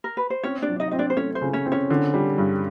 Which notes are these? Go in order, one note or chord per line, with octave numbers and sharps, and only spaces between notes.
A#4
B4
C5
C4 C#4 C#5
D4 D5
F#3
D#4 D#5
C4 D#5
D4 D5
C5
A3 C#4 C#5
C5
C#3
C#4 C#5
C4
C#4 C#5
D3
G3
G2